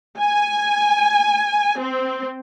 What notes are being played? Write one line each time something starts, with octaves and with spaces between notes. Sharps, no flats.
G#5
C4